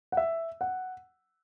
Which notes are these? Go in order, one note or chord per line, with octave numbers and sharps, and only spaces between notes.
F#5
E5
F#5